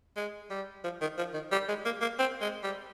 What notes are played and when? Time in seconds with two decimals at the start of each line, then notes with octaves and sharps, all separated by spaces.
0.16 G#3
0.50 G3
0.84 F3
1.01 D#3
1.18 F3
1.34 D#3
1.52 G3
1.68 G#3
1.85 A#3
2.01 A#3
2.19 C4
2.41 G#3
2.63 G3